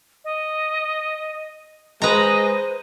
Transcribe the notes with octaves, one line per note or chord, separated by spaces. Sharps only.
D#5
G#3 B4 C5 D#5 A#5